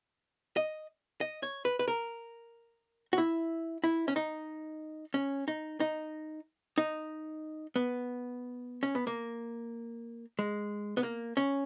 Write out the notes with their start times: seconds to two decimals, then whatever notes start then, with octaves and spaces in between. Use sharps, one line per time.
0.57 D#5
1.21 D#5
1.43 C#5
1.65 B4
1.79 B4
1.88 A#4
3.13 F#4
3.18 E4
3.84 E4
4.08 C#4
4.16 D#4
5.14 C#4
5.48 D#4
5.80 D#4
6.78 D#4
7.76 B3
8.83 C#4
8.95 B3
9.07 A#3
10.39 G#3
10.97 B3
11.03 A#3
11.37 C#4